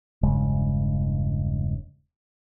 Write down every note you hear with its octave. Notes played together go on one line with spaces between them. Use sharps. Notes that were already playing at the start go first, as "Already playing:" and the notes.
E1 G2 C#3 G#3